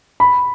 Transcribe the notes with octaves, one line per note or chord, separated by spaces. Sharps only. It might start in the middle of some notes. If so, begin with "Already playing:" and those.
B5